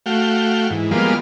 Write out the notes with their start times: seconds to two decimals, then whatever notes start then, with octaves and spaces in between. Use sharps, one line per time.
0.06 A3 F#4 F5 G5
0.70 G#2 E3
0.91 F3 G3 G#3 A#3 B3 F4